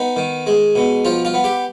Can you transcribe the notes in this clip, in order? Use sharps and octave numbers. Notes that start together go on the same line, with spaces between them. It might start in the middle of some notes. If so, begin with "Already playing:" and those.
Already playing: B3 D#4
D#3
G#3
B2
F3 F4
F4
B3
G4